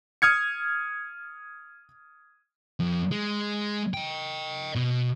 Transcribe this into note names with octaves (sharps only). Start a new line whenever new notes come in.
D#6 F6 G#6 C#7
F2
G#3
D#5 G5
B2